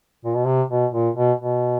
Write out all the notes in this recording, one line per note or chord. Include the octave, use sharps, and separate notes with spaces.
A#2
B2
C3
B2
A#2
B2
B2